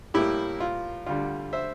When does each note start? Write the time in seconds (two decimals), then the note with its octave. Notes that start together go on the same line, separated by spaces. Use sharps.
0.14 A2 G3 A#3 E4 G4
0.60 F4
1.06 D2 D3 G3 F4
1.53 C5 E5